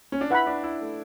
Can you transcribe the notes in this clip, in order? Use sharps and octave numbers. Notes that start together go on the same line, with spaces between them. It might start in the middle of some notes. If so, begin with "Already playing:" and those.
C#4
D4
E4 B4 F#5 B5
D4
E4
A3